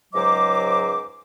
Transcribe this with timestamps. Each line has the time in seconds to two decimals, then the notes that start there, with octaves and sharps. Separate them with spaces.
0.14 C#2 G#2 F#3 C5 D#5 D6